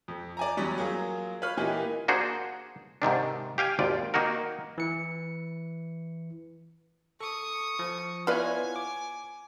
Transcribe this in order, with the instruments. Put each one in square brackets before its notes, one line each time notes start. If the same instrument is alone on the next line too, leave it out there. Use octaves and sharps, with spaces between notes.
[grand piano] F2
D5 G#5 A#5
E2 F#3 G3 C#4
F#3 A#3 F4 G#4
B4 C#5 F5 B5 F6
A#2 E3 A#3 D#4 G4 G#5
[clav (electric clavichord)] A#3 D4 F#4 G#4 C5
G#2 C3 D#3 D4
G4 F5 G5 G#5
G#1 D#2 F4 D5
D#3 A#3 D#4 F#4 A#4
[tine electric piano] E3 C#7
[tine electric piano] A4 [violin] C#6 D#6
[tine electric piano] F3
[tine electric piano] B3 E4 C#5 [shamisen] F4 B4 D5 [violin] G#5
[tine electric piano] D6